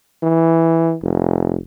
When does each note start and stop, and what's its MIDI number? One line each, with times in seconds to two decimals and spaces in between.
0.23 0.95 52
1.03 1.57 29